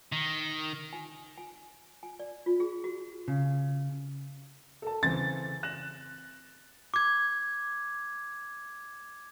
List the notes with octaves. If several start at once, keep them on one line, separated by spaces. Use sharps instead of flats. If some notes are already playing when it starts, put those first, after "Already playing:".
D#3
G#5
G#5
G#5
D5
F4
G#4
F#4
C#3
A4 A5
C#3 E3 C4 A6
F#6 A#6 E7
D6 G#6